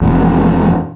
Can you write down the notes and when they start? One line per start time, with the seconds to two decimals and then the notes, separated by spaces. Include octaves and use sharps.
0.01 E1 F2